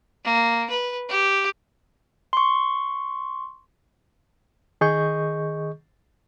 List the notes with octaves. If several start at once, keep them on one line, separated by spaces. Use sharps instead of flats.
A#3
B4
G4
C6 C#6
D#3 G#4 D#5 C#6 G6